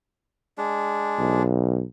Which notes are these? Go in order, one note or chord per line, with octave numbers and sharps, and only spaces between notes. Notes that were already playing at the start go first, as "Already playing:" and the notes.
G#3 D4
B1